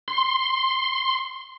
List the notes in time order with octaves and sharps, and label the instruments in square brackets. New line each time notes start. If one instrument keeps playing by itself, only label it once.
[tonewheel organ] C6